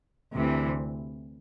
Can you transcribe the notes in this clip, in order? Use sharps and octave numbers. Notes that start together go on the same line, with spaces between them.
D2 C3 E3